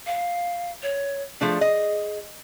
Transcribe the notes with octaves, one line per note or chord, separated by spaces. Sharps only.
F5
C#5
F3 A3 D4 G#4
D#5